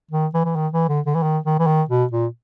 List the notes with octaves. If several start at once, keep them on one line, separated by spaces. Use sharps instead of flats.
D#3
E3
E3
D#3
E3
D3
D3
E3
D#3
D#3
E3
D#3
B2
A#2